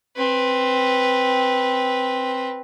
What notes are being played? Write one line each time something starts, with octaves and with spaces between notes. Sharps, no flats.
C4 B4